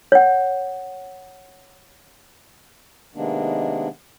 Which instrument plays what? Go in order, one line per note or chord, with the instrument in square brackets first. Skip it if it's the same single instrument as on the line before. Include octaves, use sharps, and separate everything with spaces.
[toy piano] C#5 F#5
[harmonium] C3 D#3 G#3 A#3 B3 D4